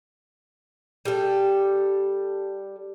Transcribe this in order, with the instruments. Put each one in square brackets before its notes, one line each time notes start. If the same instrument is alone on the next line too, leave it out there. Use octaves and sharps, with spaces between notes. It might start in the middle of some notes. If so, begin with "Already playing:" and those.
[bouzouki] G3 A4